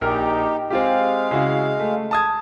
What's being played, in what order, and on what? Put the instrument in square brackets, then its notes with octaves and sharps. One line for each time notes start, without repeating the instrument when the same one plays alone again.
[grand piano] A#1 A#4 F6 [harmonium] D#4 G4
[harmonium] G#3 F5 [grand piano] C4 F4 G4
[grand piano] C#3 E4 F#4
A3
A5 D#6 G#6